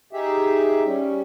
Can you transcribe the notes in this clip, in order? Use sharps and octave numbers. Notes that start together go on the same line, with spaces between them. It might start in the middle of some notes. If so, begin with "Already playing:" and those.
D#4 G4 G#4 E5
G3 C#4